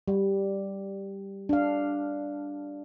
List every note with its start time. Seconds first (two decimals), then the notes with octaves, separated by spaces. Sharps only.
0.08 G3
1.49 D4 F5